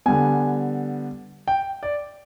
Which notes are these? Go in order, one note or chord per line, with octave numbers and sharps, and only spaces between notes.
D3 G3 B3 G#5
G5
D5